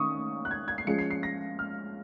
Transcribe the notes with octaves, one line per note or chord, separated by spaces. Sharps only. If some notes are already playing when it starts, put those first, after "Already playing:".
Already playing: D#3 C#4 C#6 D#6
F#6
G#6
G#6
C7
F3 G#3 C#4 F4 C#7
C7
C7
A#6
F6